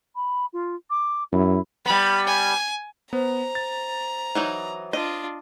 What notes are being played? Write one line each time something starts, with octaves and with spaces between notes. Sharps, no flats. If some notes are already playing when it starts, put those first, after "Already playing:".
B5
F4
D6
F#2 E4
G3 B3 B5
G#5
B3 C5 A#5
A6
E3 F#3 D#4
D4 F4 D#5